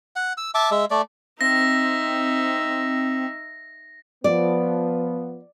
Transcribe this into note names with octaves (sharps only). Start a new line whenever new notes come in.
F#5
E6
E5 A5 D6
G#3 E5
A3 D5
C4 D#4 E5 A#6
F3 B3 D5